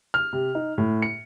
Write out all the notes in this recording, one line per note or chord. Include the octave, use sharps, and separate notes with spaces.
F6
C3
D#4
A2
C#7